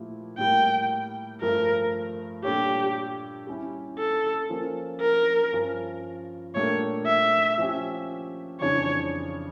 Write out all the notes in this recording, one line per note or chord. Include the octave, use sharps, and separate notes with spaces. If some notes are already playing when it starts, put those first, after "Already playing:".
Already playing: A#2 F3 A3 E4 G4
A2 G3 A#3 G5
G2 F3 A3 A#4
A#2 G3 D4 G4 A4 C#5
G3 C#4 E4
A4
F3 A#3 C#4 F4
A#4
G2 F3 C#4 F4
A#2 A3 D4 G4 A#4 C#5
E5
F3 C#4 G4
F2 C#3 E3 G3 D4 C#5